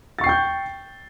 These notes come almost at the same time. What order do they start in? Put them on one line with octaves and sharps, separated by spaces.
A6 C#6 C7 G5 G6